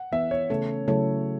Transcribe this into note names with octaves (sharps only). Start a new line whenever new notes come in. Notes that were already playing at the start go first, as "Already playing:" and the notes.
Already playing: F#5
E3 B3 E4 E5
C#5
C#3 A3 C#4 A4
C#3 F#3 A3 E4 A4 C#5